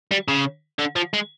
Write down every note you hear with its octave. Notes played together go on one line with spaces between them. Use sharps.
G3
C#3
D3
F3
G#3